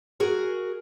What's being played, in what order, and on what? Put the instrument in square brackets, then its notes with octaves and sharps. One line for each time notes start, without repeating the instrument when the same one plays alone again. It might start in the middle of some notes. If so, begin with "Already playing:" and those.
[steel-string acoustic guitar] F#4 G#4 A#4